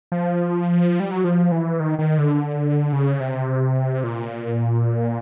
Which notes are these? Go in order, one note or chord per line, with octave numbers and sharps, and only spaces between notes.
F3
G3
F#3
F3
E3
D#3
D#3
D3
C#3
C3
A#2